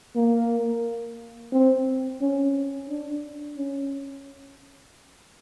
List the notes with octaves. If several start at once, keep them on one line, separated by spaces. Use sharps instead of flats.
A#3
C4
C#4
D4
C#4